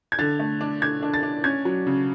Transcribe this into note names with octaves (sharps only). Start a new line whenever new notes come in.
G#6
D3 A6
A3
D4
D4 G#6
D4
A6
D4
C#4 G#6
F#3
C#3